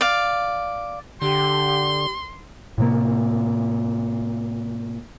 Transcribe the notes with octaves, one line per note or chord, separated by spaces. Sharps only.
D5 F5
D3 G4 C6
A2 C3 A#3